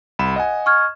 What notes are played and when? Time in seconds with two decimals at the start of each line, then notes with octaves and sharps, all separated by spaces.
0.19 C2 B5 E7
0.36 D#5 F#5 G#5
0.66 C#6 F6 G#6